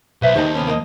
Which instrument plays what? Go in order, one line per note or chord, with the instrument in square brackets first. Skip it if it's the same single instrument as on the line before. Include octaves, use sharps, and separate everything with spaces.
[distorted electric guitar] B1 [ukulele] B4 C5 E5
[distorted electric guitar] D#2 [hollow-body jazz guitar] D#3 D#4 G4 [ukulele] C5 A5
[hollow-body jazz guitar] C3 B3 C#4
A#3 B4 D#5